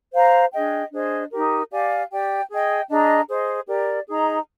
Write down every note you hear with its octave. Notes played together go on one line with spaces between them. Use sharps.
C5 F5 A#5
D4 G#4 D#5 G5
D4 G#4 C5 D#5
D#4 G4 A#4
G4 D5 F5 G#5
G4 D5 G5
G#4 D#5 G5
D4 G#4 D#5 A#5
G#4 C5 D#5
G4 A#4 D5
D#4 G#4 D#5 A#5